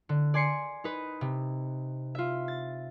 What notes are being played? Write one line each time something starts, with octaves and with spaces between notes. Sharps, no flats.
D3
D5 G#5 C6 C7 C#7
D#4 B4
C3
F4 E5
A6